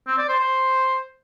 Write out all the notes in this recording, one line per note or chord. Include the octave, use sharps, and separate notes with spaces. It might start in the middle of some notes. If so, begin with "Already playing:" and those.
C4
D5
C5
C5